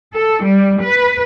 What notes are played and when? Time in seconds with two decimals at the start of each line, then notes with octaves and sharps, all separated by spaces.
0.13 A4
0.43 G3
0.81 B4